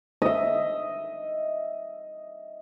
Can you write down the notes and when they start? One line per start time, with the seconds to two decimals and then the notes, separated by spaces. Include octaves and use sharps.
0.22 D#5 E5